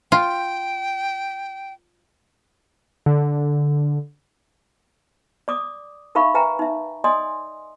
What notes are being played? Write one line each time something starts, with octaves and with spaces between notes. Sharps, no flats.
F4 G5
D3
D5 D6 D#6
D#4 A#4 E5 F5 B5 C#6
B4 E5 G5 G#5 A#5
D#4 E5
D5 D#5 G#5 C6 D#6